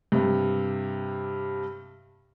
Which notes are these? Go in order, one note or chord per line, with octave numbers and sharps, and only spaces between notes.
G2 C3